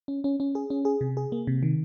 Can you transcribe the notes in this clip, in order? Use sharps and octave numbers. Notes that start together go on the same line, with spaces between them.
C#4
C#4
C#4
G#4
C#4
G#4
C3
G#4
A#3
C3
D#3